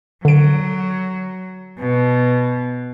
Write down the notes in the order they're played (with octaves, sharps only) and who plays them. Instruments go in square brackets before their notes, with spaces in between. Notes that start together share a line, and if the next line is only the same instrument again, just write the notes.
[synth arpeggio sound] D3 D7 [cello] F#3
[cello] B2